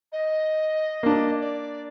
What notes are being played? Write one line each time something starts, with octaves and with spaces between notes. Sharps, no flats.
D#5
A#3 D4
D5